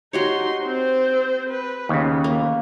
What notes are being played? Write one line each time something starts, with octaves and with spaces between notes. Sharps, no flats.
D#4 F#4 G4 C#5 C6
C4 C5
B4
D#2 C#3 B3
A#3